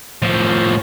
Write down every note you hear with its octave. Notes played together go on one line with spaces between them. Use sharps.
A2 F3